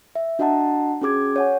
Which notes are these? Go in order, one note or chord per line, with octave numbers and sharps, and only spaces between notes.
E5
D4 F#4 D#5 F#5 A5 A#5
C#4 F#4 G#4 D6 G#6
C#5 F#5 G#5